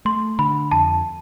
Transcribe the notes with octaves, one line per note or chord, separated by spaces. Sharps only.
A3 C6
D3 B5
F2 A5